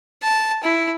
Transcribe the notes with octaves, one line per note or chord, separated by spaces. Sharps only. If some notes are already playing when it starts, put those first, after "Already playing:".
A5
E4